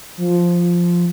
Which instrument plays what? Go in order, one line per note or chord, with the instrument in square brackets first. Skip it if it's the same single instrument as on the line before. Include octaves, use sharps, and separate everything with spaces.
[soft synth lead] F3